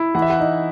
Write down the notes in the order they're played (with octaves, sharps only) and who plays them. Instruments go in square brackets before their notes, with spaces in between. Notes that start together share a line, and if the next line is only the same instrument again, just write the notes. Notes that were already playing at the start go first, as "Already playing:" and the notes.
Already playing: [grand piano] E4
E3 F#5
E5
F#5
D#4